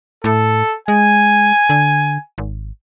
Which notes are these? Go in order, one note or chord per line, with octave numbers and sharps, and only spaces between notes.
A2 A4
G#3 G#5
D3
G#1